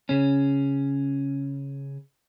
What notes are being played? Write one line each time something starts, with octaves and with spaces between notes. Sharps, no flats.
C#3 C#4